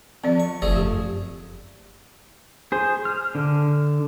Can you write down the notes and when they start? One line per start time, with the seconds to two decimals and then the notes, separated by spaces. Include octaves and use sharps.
0.24 F2 C4 D5
0.40 C#6
0.62 F#1 F3 A3 G#4 D5
0.76 F#2 G4
2.72 G#4 C5
3.05 F6
3.35 D3